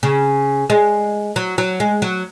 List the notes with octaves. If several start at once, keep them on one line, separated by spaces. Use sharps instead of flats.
C#3
G#3
F#3
F#3
G#3
F#3